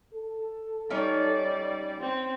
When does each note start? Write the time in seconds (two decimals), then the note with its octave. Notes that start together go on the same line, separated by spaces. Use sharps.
0.13 A4
0.90 G3 C#4 D#4 C#5 D5
2.00 C4